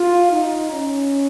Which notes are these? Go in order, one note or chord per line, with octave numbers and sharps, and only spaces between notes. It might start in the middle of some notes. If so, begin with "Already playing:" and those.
Already playing: F4
D#4
C#4